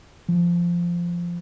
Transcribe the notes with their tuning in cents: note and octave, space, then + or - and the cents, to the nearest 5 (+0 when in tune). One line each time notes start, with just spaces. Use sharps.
F3 -10